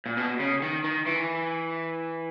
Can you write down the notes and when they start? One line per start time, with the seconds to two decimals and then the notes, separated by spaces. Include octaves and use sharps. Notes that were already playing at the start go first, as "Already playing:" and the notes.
0.06 A#2
0.17 B2
0.40 C#3
0.62 D#3
0.84 D#3
1.06 E3